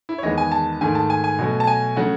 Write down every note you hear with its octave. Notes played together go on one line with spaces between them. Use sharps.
E4
C#5
E2 D#3 G#3 B3 D#5
G#5
A5
G#2 D#3 A3 G#5
A5
G#5
G#5
B2 F#3 A3
A5
G#5
C#3 F#3 A3 F#5